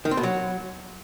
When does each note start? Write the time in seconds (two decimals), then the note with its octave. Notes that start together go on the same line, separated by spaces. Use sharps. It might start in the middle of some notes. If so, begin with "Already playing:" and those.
0.05 D#3
0.11 C4
0.17 B2
0.23 F#3